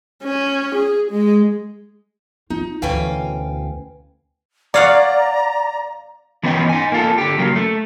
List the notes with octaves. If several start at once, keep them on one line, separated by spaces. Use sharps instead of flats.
C#4
G#4
G#3
D#4 F4
D2 B2 E3 C#4 F5 G5 G#5
C#5 D5 F5 F#5 A#5
E3 B3 C#4 B4 D#5 G5
D#4 G#5
A#3 F4 A4
D3 G4
C#3 F#3 A#3
A3